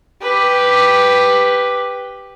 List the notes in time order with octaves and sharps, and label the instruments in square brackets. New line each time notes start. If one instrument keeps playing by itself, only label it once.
[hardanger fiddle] G4 B4